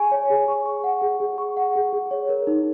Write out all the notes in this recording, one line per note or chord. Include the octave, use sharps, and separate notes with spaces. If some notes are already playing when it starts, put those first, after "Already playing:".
Already playing: G#4 G#5 C#6
C#5
G#4
C#6
C#6
F#5
G#4
G#4
C#6
F#5
G#4
G#4
C#5
A#4
D#4